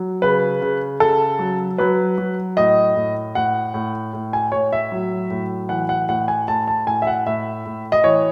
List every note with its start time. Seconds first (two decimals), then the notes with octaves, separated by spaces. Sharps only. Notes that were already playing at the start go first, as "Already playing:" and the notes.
Already playing: F#3
0.22 C#3 B4
0.62 C#3
1.00 C#3 A4
1.39 F#3
1.78 F#3 B4
2.18 F#3
2.57 A2 D#5
2.96 A2
3.35 A2 F#5
3.74 A2
4.13 A2
4.33 G#5
4.52 A2 C#5
4.73 E5
4.92 F#3
5.30 A2
5.69 E3 F#5
5.89 F#5
6.09 A2 F#5
6.28 G#5
6.48 A2 A5
6.68 A5
6.86 A2 G#5
7.02 E5
7.07 F#5
7.26 A2 E5
7.66 A2
7.92 D#5
8.04 E3 C#5